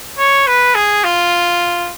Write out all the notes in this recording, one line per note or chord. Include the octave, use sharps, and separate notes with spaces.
C#5
B4
G#4
F4